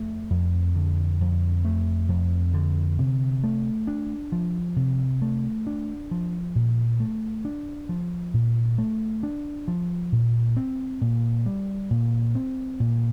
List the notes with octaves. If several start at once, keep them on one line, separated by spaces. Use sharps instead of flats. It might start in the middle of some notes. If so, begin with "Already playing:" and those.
Already playing: F2 A3
F2
D3
F2
A3
F2
D3
C3
A3
D4
F3
C3
A3
D4
F3
A#2
A3
D4
F3
A#2
A3
D4
F3
A#2
C4
A#2
G3
A#2
C4
A#2